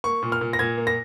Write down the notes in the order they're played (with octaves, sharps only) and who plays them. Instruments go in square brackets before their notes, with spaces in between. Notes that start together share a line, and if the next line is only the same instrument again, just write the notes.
[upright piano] A#3 C#6
A#2
F6
A#2
A#6
A#2 G#6
A#3
A#6